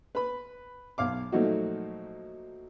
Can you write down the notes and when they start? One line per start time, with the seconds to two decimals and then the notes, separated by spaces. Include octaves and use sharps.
0.15 B4 B5
0.98 B1 F5 D6
1.32 A#2 F3 F#3 A3 D#4 F#4